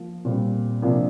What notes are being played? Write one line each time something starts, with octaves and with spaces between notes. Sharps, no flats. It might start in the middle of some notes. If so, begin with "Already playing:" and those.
Already playing: F3 A#3 F4
A#2 G3 C4
C3 F3 A#3 D4